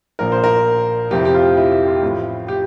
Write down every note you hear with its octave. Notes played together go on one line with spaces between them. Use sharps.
A#1 A#2 F3 A#4
C5
A#4
F2 C3 F3 C4 E4 G4
G4
F4
E4
E4
F4
A1 A2 F3 C4 E4
G4